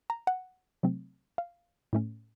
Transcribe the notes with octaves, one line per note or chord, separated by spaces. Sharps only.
A#5
F#5
C3 F#3 A3 C4
F5
A2 A3 C#4